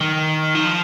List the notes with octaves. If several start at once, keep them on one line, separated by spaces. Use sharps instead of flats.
D#3
F3